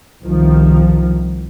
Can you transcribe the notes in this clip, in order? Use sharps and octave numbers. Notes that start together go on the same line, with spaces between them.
C2 D#3 F3